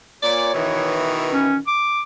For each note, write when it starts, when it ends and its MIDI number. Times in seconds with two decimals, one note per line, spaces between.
0.22 0.51 46
0.22 1.08 73
0.22 0.51 74
0.54 1.61 47
0.54 1.61 51
0.54 1.61 52
1.32 1.58 61
1.67 2.02 86